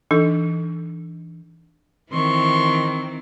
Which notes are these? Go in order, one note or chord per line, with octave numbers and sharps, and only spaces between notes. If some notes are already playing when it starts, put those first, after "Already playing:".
E3 D4 D#4 A4
D#3 E3 C4 C6 C#6